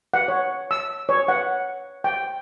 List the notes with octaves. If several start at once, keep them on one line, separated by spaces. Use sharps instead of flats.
F#5
C#5
E6
C#5
F#5
G5